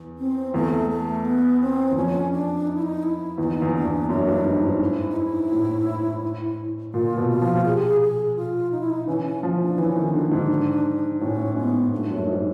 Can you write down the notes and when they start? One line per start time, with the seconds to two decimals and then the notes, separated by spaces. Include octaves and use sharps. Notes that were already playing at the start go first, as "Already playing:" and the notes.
Already playing: E2
0.18 C4
0.54 E2 A3
0.89 A3
1.25 B3
1.60 C4
1.91 E2
1.96 F2 C#4
2.32 D4
2.67 D#4
2.75 E4
2.82 D#4
3.03 E4
3.38 E2 D#4
3.62 E2
3.74 D4
3.85 E2
4.09 F#2 D4
4.27 G2
4.45 G#2 D#4
4.63 G#2
4.80 E4
5.09 D#4
5.16 E4
5.52 A2
6.94 A#2 F4
7.17 B2
7.29 F4
7.42 F3
7.65 G#4
7.73 G4
7.82 G#4
8.01 G#4
8.36 F4
8.72 D#4
8.81 E4
8.90 D#4
9.07 E3 C#4
9.25 C#4
9.43 F3
9.61 D4
9.78 E3 C#4
9.96 D#3
10.13 D3 D4
10.31 G#2
11.20 A2 C#4
11.56 G#2 B3
11.92 G2 A3
12.10 F#2
12.27 G#2